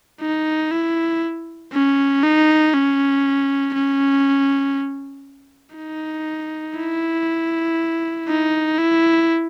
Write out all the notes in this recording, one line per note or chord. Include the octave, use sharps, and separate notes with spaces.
D#4
E4
C#4
D#4
C#4
C#4
D#4
E4
D#4
E4